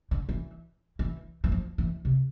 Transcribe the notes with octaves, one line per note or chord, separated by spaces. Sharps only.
D3
E3
E3
E3
F3
E3
C3